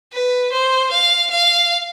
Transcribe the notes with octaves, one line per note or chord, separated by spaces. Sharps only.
B4
C5
F5
F5